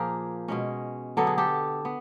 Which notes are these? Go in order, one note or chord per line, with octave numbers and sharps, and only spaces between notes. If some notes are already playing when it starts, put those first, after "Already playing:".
Already playing: A#2 F3 A#3 G#4 A#4
B2 G#3 C#4
D3 F#3 B3 A4
G#4
G4 A4
B3